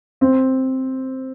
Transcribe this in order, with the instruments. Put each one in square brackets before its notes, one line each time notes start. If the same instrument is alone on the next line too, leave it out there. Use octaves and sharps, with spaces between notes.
[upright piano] C4